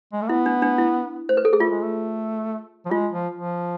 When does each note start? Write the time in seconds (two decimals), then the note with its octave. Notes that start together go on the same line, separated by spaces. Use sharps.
0.13 G#3
0.22 A3
0.29 B3 E4
0.46 D4
0.62 D4
0.78 E4
1.29 C5
1.37 B4
1.45 A4
1.53 G#4
1.60 A3 F4
1.70 G#3
1.81 A3
2.86 F3
2.91 G#3 F4
3.12 F3
3.35 F3